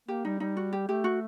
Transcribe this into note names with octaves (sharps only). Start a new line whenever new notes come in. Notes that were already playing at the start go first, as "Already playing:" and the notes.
A#3 G4
G3 D#4
G3 D#4
F#4
G4
A3 G4
F#4